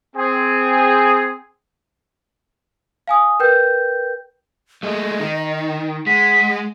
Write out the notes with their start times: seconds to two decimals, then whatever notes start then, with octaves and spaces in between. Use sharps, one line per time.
0.16 C4 G#4
3.07 F5 G#5 D#6
3.40 A#4 B4 G5 G6
4.83 G#3 A3 D#5
5.20 D#3
6.07 G#3 F#5 B6